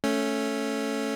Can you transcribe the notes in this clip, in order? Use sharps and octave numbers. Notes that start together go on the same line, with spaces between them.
A3 C#4